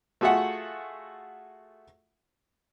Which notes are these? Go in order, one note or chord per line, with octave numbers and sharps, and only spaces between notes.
A3 F4 F#4 G#4 E5 F#5